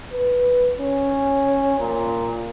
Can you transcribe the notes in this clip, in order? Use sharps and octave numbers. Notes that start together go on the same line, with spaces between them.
B4
C#4
A#2